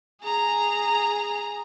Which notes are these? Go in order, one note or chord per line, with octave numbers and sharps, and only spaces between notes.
G#4 A#5